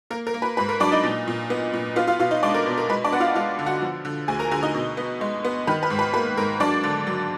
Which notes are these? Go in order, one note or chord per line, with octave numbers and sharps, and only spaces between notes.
A#3 A#4
A#4
A#3
B4
G#2 B4
A#4
F#3 D4 D5
D#4 D#5
A#2
A#2
B3
A#2
B3 F4 F5
F4 F5
B2 F4 F5
D#4 D#5
G#3 D4 D5
A#4
B2
A#4
G#3 B4
D4 D5
B3 F#5
F4 F5
G#3 F4 F5
D3
F#4 F#5
F3
D3
D2 G#4 G#5
A#4 A#5
D3 G#4 G#5
D#4 D#5
B2
B3
G#3
B3
D#3 B4
B4
G#2
B4
A#3 B4
G#2 A#4
F#3 D4 D5
D3
F#3